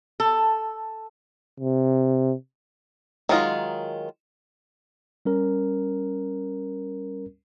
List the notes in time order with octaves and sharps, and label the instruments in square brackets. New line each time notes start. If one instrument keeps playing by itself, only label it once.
[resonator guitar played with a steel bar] A4
[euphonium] C3
[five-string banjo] D#3 F#3 G#3 F4 D#5
[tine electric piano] G3 C#4 A#4